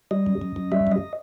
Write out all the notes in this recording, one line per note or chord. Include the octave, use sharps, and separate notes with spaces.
G3 D#5
F#2
F#2
F#2
G3 E5
F#2 D#5